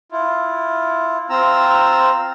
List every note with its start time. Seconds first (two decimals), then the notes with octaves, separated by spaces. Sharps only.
0.12 E4 F4
1.30 C4 F4 A#5 E6